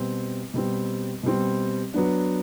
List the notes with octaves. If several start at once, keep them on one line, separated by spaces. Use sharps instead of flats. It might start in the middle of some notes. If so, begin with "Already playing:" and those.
Already playing: B2 G3 C4
B2 G3 C4
B2 G3 C4
F#3 B3 D4